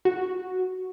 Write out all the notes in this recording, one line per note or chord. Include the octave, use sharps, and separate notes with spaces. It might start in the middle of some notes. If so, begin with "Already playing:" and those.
F#4